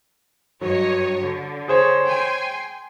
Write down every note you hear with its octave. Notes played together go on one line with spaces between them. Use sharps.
G2 F#3 C#5 D#5
D3
G#4 C5 C#5
G5 G#5 C6